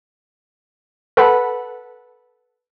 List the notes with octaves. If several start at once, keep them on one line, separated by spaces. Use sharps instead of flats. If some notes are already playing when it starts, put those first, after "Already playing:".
A4 B4 F#5 B5